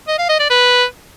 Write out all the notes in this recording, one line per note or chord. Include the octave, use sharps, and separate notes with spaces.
D#5
F5
D#5
D5
B4